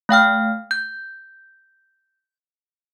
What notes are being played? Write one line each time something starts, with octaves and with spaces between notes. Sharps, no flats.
A3 F5 G5 F6
G6